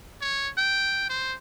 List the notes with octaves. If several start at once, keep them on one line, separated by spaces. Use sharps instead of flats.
C#5
G5
C5